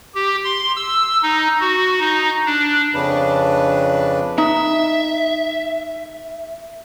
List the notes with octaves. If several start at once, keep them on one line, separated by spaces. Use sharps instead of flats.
G4
C6
E6
D#4
F#4
D#4
D4
F2 C#3 D4 B4
D#4 E5